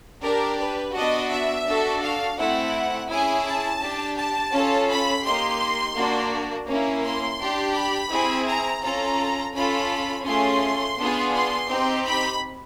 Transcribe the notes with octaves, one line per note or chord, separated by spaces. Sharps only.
D4 G4 A#4
B4
B3 D4 F#4 D#5
E5
D4 F#4 A4
F5
A3 C4 E4 F#5
C#4 E4 G#4 G#5
A5
D4 G4
A5
C#4 F4 A4
B5
A#3 D#4 G4 C6
A#3 D4 F#4
A#3 C#4 E4
C6
D4 G4
B5
C4 E4 G#4
A#5
C#4 F4 A4 A#5
C#4 F4 A4 B5
A3 C#4 F4 G#4 C6
B3 D4 F4 G#4
C6
C4 D#4 G4
B5